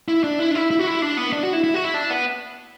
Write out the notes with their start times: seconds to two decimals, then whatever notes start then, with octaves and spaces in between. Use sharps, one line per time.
0.08 E4
0.24 D4
0.39 E4
0.51 D4
0.55 E4
0.71 E4
0.79 F#4
0.87 E4
1.02 D4
1.17 B3
1.33 D4
1.43 F#4
1.53 E4
1.64 E4
1.74 F#4
1.84 E4
1.94 D4
2.10 B3